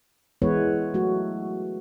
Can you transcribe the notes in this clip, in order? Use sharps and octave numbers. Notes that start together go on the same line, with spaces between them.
E3 G#3 B3 E4 B4 C#5
F#3 A3 F#4